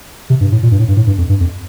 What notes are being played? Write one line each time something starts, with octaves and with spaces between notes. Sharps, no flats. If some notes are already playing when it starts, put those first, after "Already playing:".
C3
G2
A2
A#2
G2
A2
G2
A2
G2
F2
G2
F2